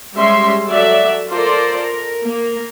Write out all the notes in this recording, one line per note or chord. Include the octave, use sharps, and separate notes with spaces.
G3 G#3 C#4 G4 E5 C6
F#3 A4 D5 E5
F4 A4 A#4 C5 D5
A#4
A#3